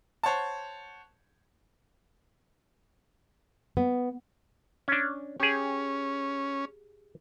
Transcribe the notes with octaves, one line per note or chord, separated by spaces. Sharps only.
C5 C#5 F#5 A5
B3
C#4 D4
C#4 G4 G#4